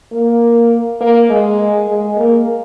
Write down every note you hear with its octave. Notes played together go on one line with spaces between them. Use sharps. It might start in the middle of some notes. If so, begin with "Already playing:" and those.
A#3
A#3
G#3
G#3
A#3